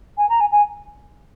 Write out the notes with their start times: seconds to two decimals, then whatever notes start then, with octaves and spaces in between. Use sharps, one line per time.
0.18 G#5
0.29 A#5
0.40 G#5
0.52 G#5